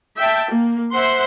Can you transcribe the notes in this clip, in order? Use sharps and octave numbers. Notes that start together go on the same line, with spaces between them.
E5 G5 A5
A#3
C5 E5 F#5 C6